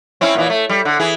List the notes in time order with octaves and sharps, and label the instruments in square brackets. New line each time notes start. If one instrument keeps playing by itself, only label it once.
[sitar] C4 C#4 E4
A#2 E3
A3
G3
D3
E3 G#4